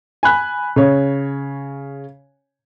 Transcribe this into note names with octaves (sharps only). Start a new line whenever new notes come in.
G#5 B5 F#6
C#3 C#5